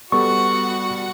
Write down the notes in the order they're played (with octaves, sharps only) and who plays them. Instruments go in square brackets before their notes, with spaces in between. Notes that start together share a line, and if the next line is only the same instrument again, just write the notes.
[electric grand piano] G3 B3 A4 [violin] F#4 F#5 [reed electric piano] C#6